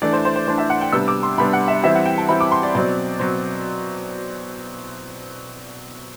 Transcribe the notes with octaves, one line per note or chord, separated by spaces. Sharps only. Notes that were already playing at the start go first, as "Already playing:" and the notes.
E3 A3 D4 D5
C5
C5
C5
E3 A3 D4 C5
E5
F#5
G5
C3 G3 B3 D4 E6
D6
C6
C3 G3 B3 D4 B5
F#5
E5
E3 G3 C4 E4 E5
F#5
G5
A5
E3 G3 C4 E4 B5
D6
C6
D5
B2 F#3 C4 D5
B2 F#3 C4